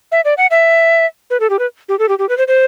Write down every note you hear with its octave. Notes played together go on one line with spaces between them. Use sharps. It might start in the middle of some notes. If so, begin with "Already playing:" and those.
E5
D5
F#5
E5
B4
A4
G4
B4
G4
A4
G4
G4
B4
C5
C5